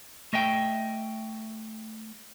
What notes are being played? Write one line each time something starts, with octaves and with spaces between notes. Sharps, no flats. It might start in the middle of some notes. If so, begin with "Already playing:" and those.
A3 D#5 E5 G5